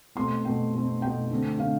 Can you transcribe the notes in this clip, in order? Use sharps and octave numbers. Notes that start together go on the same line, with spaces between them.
B2 A3 C4 C6
B2 A3 C4 G5
B2 A3 C4
B2 A3 C4 G5
D3 A3 C4
D3 A3 C4 F5